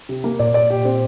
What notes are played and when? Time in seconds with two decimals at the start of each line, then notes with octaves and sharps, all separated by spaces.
0.09 C3
0.24 A#3
0.39 A#2 D5
0.54 D5
0.70 G4
0.85 C4